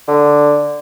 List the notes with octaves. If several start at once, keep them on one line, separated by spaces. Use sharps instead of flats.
D3